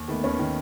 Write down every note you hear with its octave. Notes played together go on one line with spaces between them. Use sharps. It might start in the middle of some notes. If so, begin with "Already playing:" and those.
Already playing: D#2
D#3 A3 B3
D#2 B3 C#4
D#3